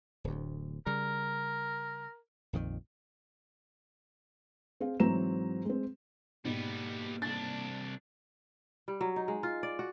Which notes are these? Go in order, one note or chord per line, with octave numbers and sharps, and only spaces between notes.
D1 D2
C#3 G3 A#4
A#1 F2 D#3
C4 G#4 F5
G#2 E3 F#3 C4 A#5 E7
G#3 C4
G#2 B2 G3 A#3 B3
C2 D4 A6
G3
F#3
D#4
G#3
F4
D5
F#4